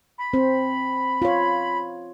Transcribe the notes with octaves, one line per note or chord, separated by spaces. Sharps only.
B5
C4 C5
F4 C#5